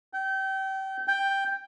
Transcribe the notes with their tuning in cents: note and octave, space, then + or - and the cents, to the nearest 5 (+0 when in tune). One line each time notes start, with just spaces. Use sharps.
G5 -30
G5 +5